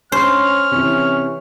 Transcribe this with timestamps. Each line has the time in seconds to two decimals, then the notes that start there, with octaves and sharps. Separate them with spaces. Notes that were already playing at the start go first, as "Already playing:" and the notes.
0.12 C#4 C5 F6
0.71 C3 E3 C#4